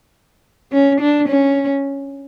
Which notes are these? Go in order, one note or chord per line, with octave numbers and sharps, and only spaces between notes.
C#4
D4
C#4